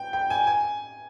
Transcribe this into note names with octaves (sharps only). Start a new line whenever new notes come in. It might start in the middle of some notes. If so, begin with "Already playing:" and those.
Already playing: G5
G5
G#5
G#5